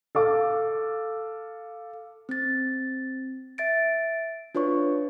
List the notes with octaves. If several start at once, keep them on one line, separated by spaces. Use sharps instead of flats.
A4 F5 D6
C4 A6
E5 A6 D7
D4 F4 B4 C#5 C#6